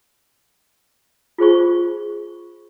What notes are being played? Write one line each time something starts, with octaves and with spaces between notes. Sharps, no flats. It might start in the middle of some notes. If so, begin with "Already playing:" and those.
F4 G#4 C5 C#6